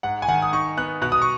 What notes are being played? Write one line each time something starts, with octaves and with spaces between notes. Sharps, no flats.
G#2 F#5
G#5
D#3 F#5
D#6
D#4 C#6
B3 F#6
B2 F#6
D#6
C#6